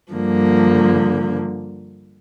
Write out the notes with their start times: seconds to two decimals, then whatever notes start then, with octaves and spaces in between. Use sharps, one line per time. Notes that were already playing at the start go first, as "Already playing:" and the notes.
0.14 G2 D3 F3 A#3